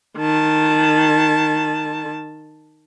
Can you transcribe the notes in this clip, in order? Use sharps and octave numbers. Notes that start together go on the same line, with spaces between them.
D#3 A5